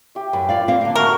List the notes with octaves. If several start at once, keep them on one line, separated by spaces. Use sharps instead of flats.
G4 E5
F#2 B4
F4 D5 F5
A#3 C4 F5
D3 A#3
A3 F#4 A#4 B4